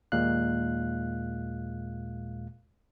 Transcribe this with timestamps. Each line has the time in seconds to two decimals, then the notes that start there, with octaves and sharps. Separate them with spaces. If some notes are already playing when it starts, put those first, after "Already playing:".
0.12 D#2 A#2 G#3 F5 F#6